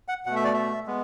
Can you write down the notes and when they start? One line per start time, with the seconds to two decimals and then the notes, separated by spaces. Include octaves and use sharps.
0.08 F#5
0.26 B2 A3 F#5
0.36 E5
0.44 D5
0.53 E5
0.86 G#3 B3